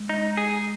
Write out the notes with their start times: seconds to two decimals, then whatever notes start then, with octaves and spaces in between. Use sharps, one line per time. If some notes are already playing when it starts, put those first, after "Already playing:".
Already playing: G#3
0.09 D#4
0.37 G#4